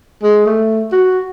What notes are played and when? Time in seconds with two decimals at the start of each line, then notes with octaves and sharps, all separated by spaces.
0.23 G#3
0.46 A3
0.92 F#4